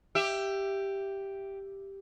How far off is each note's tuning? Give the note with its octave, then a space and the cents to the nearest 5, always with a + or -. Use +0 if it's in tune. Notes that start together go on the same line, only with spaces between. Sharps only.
G4 +0 E5 +15